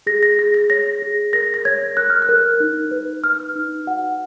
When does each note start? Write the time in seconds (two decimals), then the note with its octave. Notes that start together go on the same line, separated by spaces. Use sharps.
0.07 G#4 A#6
0.23 A#6
0.38 G#4 A#6
0.54 A#6
0.70 C#5 A#6
1.02 G#4
1.33 A#4 A#6
1.54 A#6
1.65 C#5 G#6
1.97 A#4 F#6
2.10 F6
2.22 F#6
2.29 A#4
2.60 D#4
2.91 B4
3.24 D#4 F6
3.56 D#4
3.86 F#4 F#5